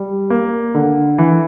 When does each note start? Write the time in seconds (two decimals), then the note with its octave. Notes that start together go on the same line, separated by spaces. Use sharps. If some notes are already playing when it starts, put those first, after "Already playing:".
Already playing: G3
0.30 A#3
0.75 D3
1.18 E3